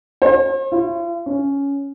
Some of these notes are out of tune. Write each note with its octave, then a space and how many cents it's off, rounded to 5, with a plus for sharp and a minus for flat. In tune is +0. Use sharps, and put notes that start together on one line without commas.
C5 +45
F4 -45
C#4 +10